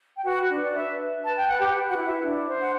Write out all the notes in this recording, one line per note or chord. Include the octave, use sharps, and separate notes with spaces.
G5
F#4 B4 F#5
D4
D5
B4 E5
B4
B4 A5
G5
B4 F#5
G4 G5
B4
F#4 F#5
E4
E5
D4
C5
F#5